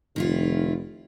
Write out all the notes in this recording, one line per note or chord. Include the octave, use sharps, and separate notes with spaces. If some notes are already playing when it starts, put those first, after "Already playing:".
F1 D#3 E4 F4